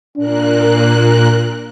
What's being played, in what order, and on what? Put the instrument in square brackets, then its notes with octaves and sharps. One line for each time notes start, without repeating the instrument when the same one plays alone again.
[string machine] A#2 A#3 F#6 [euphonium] D4